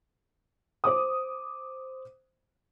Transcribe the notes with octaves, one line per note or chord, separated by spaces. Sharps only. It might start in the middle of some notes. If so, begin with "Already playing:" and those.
C5 D6 D#6